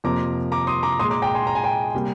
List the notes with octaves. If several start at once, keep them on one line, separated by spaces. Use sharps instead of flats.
F2 C3 F3 A#3 A#5 D6
A#5 D6
C6 D#6
A#5 D6
A#2 G#3 C6 D#6
A#5 D6
G5 A#5
G#5 C6
A#5
G#5
G5 A#5
C3 G3 A#3